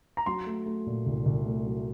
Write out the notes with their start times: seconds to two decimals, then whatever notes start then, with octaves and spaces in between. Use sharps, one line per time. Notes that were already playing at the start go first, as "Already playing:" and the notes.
0.17 A#5
0.26 F#3 C6
0.46 A3
0.66 A3
0.86 A#2
1.06 C2
1.26 C2
1.46 A3
1.66 F#3